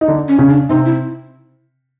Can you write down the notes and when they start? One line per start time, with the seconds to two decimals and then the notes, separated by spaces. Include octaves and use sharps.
0.01 D#4
0.08 D3 D4
0.28 C#4
0.39 C#3 C#4
0.49 D4
0.69 C3 C4 D#4
0.85 E4